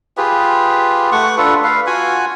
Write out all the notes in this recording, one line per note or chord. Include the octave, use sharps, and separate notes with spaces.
F4 G4 G#4 B4
A3 F#5 C#6
D4 F4 A4 B4
B4 F5
F4 F#4 F#5 G#5